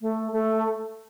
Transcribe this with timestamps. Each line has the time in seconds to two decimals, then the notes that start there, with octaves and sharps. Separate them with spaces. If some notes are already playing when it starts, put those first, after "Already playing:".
0.01 A3
0.32 A3